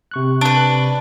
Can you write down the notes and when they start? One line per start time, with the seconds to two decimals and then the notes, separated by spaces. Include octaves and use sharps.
0.11 C3 C#6 F#6
0.41 D4 B4